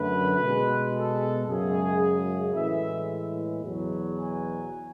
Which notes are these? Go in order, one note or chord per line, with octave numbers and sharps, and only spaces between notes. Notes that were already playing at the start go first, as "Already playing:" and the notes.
Already playing: F#2 D3 A3 B4
B2 G#3
A4
F#2 C#3 G#3 G#4
A2 E3 G#3 E5
E2 B2 F#3
G#5